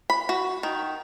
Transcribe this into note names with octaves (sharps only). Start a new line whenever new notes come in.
B5
F#4
D#3